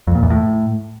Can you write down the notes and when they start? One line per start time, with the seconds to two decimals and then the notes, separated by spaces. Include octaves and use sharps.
0.07 F2
0.15 A#2
0.23 E2
0.30 A2